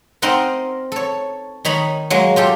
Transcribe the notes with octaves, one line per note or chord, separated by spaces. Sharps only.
C4 D#4 A#4 C5 D#5 F#5
A4 C#5
D#3 D#4 C#5 B5
F#3 G#3 A#3
F4 G4 A4